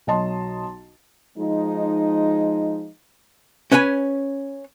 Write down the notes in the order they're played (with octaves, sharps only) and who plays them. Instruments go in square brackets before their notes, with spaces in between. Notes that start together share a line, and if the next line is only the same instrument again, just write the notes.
[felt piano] B1 F#3 D#5 A5 C6
[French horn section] F3 G#3 D#4
[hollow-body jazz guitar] C#4 B4 C#5 G#5 B5